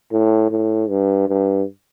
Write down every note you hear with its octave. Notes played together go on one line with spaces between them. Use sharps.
A2
A2
G2
G2